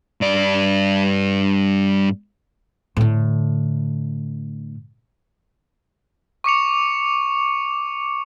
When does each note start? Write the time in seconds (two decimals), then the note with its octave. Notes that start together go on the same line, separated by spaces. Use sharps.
0.21 G2 D5
2.97 A2 D3
6.44 C#6 D6 C#7 F7